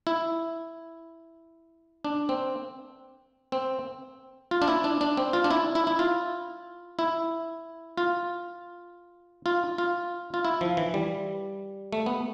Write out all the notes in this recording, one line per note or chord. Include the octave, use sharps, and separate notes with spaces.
E4
D4
C4
C4
F4
D4
E4
D4
D4
C4
F4
D4
E4
E4
E4
F4
E4
F4
F4
F4
F4
E4
F3
E3
G3
A3
B3